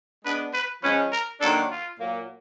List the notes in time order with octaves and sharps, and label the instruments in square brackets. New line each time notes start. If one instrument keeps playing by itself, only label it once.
[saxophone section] G#3 B3 D4 [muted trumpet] B4
[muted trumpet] B4
[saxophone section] F3 G#3 C#4 [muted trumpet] B4
[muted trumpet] A#4
[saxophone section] D#3 F#3 A#3 D4 [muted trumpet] A4
[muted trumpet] F4
[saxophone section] A#2 F#3 A#3